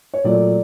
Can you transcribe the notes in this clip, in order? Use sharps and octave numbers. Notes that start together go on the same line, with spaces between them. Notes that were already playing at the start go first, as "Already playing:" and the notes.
C#5
A#2 F#3 A3 D5